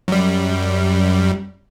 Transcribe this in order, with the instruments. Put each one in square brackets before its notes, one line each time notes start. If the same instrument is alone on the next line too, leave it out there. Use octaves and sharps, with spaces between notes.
[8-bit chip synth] F#2 G3